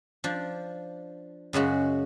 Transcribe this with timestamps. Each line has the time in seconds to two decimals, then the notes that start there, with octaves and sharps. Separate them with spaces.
0.24 F3 D4
1.53 F#2 C#3 G#3 F#4